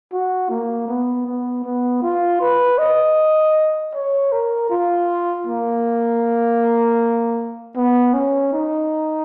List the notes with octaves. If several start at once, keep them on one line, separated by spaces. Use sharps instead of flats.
F#4
A#3
B3
B3
B3
F4
B4
D#5
C#5
A#4
F4
A#3
B3
C#4
D#4